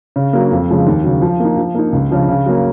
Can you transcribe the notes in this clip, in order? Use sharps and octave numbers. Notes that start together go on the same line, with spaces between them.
C#3
F#3 A#3
F2
C#3 F3 G#3
D#2
C#3 F#3
F3
A#3 D#4
F3
A#3 D#4
C#2
C#3 F3
C#3
F#3 A#3